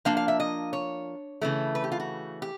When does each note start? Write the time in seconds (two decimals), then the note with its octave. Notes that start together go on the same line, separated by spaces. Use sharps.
0.05 F3 A#3 D4 F5
0.17 F5
0.28 E5
0.40 D#5
0.73 C#5
1.41 C#3 E3 A3
1.75 B4
1.84 G4
1.92 F4
2.00 F#4
2.42 G4